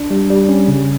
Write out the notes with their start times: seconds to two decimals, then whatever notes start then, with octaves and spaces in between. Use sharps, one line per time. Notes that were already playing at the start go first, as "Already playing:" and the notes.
Already playing: D4
0.11 G3
0.30 G3
0.49 C#4
0.68 C#3